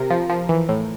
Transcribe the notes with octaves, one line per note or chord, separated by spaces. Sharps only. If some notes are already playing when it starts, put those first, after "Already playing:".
Already playing: C3 A#4
F3
F3
E3
A2